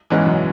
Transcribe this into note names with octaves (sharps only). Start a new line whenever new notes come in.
E2 G#2 E3 G#3 C#4
F#2 B2